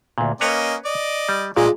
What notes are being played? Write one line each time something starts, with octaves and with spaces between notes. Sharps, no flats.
D2 A#2
A#3 C#4 B4 C#5 D#5 A#5
D5 D#5
G3
A#2 G#3 F4 G#4 D5 D#5